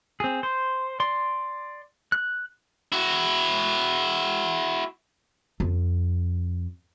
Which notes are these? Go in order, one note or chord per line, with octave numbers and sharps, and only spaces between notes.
C4 G#4
C5
D5 C6
F#6
E4 F#4
F2